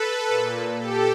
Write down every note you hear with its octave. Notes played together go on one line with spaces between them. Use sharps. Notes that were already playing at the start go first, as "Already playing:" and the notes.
Already playing: A4 B4
A#2
G4 A4